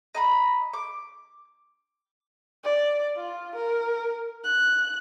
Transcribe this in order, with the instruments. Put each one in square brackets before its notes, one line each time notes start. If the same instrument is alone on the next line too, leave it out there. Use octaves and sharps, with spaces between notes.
[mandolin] D#5 A#5 B5
D6
[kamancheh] D5
F4
A#4
F#6